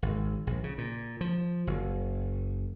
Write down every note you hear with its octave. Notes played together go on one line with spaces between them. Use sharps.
G#1
A#1
C#3
A#2
F3
F#1